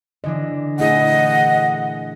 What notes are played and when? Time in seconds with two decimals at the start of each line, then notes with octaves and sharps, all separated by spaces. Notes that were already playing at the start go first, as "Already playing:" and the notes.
0.24 D3 E3 D4 D#5
0.79 A#2 A3 E4 G#4 D#5 F#5